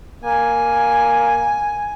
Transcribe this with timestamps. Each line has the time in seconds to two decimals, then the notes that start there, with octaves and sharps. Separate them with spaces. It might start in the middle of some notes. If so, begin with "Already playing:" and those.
0.24 A#3 G#5